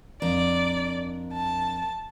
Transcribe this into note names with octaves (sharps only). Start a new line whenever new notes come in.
F2 D4 A#4 D5
A5